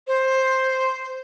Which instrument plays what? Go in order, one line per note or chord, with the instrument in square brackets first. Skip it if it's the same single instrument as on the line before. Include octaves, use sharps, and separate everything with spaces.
[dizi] C5